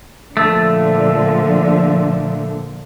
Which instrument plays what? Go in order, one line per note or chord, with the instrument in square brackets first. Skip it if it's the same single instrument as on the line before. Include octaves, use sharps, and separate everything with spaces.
[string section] A#2 D3 F3 [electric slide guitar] A3